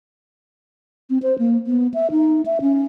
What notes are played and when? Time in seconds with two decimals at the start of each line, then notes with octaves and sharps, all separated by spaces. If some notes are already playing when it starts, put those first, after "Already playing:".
1.10 C4
1.23 C5
1.39 A#3
1.67 B3
1.94 E5
2.11 D#4
2.46 E5
2.61 C#4